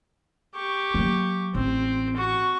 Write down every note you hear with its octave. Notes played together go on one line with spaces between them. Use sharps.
G4 C#6
F#3 A#3
A1 C4
F#4 C#6